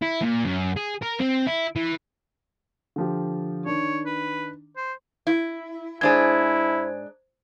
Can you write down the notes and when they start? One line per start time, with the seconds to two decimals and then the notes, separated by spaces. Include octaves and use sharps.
0.02 E4
0.23 A#2
0.45 F#2
0.77 G#4
1.03 A#4
1.20 C4
1.47 E4
1.76 E3
2.96 D3 F3 G4
3.66 D#3 D4 C#5
4.06 B4
4.76 C5
5.27 E4
6.01 G#2 D4 E4 G#4 C5 G#6